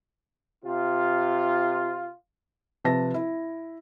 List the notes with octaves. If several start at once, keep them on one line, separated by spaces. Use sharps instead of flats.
C3 F4
C3 F3 B4 A5 A#6
E4